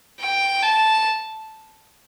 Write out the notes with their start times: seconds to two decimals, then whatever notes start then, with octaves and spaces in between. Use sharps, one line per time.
0.21 G5
0.63 A5